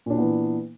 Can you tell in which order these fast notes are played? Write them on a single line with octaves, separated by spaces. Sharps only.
A#2 D4 E4 B3 E3